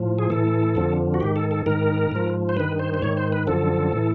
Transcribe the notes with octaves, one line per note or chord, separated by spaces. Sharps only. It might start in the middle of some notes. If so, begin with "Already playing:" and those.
Already playing: A2 F3
G#4
A2 E3 A4
F2 D3 F3
F#4
G#2 D#3 G4
A4
A4
G#2 D#3 A#4
G#2 F3
C5
G2 D#3 B4
C5
C5
G#2 D#3 C#5
C5
B4
F#2 D3 F3 A4
A2 E3